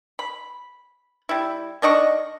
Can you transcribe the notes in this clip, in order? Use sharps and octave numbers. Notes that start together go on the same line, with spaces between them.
B5
G3 E4
D#3 D4 D#5 C#6